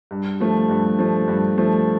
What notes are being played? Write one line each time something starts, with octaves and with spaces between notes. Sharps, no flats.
G2
F3 A3
G2
F3 A3
G2
F3 A3